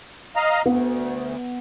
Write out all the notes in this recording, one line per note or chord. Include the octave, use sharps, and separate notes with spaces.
D#5 F5 A#5
D2 B3